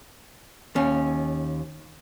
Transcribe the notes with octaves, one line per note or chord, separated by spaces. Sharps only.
D#2 C#4